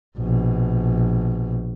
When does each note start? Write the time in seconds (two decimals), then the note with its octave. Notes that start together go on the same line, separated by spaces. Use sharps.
0.18 A#1 B2